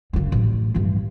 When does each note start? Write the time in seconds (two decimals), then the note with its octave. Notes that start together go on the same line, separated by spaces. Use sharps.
0.13 F#2 C#3
0.32 A1
0.74 G2 E3